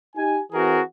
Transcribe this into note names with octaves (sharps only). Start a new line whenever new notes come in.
D#4 G4 G#5
E3 C4 F#4 G#4 A#4